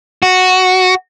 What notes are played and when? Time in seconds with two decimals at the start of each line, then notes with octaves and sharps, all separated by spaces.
0.22 F#4